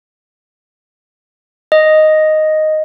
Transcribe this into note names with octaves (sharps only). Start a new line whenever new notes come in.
D#5